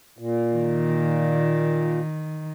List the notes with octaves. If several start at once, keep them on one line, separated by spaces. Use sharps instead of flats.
A#2
D#3